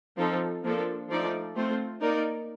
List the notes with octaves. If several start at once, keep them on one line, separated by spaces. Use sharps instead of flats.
F3 C4 D#4 A4
F3 A#3 D4 A4
F3 A3 D#4 A4 D5
A3 C4 F4 C5
A#3 D#4 A#4 D5